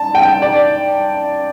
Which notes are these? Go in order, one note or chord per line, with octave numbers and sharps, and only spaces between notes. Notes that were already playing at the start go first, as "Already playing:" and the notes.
Already playing: A5
G5
D5